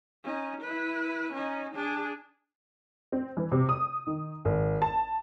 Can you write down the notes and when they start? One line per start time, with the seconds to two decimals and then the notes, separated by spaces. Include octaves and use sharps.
0.24 C#4 D#4
0.61 E4 B4
1.32 C#4 D#4
1.74 D4 G#4
3.12 C4
3.37 E3
3.52 C3
3.69 D#6
4.07 D#3
4.45 G#1
4.82 A5